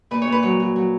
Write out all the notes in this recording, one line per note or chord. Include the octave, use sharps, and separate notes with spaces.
A#2 B4
C#5
A#2 B4
F#3 C#5
F#3
F#3